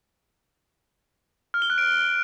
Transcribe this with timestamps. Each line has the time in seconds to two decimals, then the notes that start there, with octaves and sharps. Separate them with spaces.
1.54 F6
1.62 G7
1.70 F#6
1.78 D7